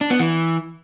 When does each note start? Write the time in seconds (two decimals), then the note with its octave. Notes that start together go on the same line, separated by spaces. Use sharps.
0.01 D4
0.10 B3
0.19 E3